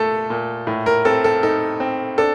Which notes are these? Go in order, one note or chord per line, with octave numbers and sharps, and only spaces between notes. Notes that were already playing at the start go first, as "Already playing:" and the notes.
Already playing: A#2 A3 A4
A#2
A2
A#4
C4 A4
A4
D#4 A4
C4
D4 A4